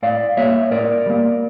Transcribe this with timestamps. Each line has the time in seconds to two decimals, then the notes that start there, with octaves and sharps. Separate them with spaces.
0.03 A2 D5 F5
0.37 G3 A#3 C#5 E5
0.71 A2 A#4 D5
1.06 G3 A#3